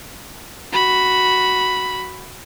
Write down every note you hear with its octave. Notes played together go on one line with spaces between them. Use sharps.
F#4 B5